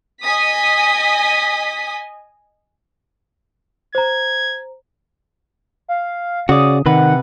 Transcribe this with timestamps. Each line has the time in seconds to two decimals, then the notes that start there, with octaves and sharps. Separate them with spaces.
0.23 D#5 G#5 D#6 B6
3.95 C5 A#5 G#6
5.88 F5
6.49 C#3 F#4 D5 D#6
6.86 C3 D#3 B4 F#5